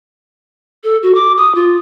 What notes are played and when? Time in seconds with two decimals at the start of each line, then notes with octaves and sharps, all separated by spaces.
0.84 A4
1.03 F#4
1.15 D6
1.37 D#6
1.55 F4